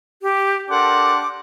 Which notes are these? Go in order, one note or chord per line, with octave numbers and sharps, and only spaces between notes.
G4
D4 G4 A4 A#4 F#5 C6 D6